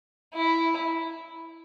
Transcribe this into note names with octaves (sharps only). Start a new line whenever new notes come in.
E4